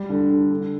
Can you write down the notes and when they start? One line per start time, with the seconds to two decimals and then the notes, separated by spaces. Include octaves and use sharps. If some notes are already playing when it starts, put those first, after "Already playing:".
Already playing: G3
0.10 D3
0.30 D3
0.50 D3